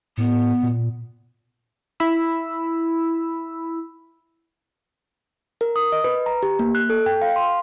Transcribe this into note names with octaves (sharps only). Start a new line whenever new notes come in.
A2 B3
A#2
E4 B5 E6
A#4
D#6
D#5
B4
A#5
G4
A#3
F#6
A4
G5
F5
C6